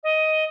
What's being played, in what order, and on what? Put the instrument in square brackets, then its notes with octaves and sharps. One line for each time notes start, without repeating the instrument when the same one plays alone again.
[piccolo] D#5